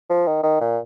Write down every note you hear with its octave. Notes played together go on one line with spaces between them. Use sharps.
F3
D#3
D#3
A#2